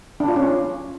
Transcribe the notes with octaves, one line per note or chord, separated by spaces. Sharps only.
D4
F4
C#4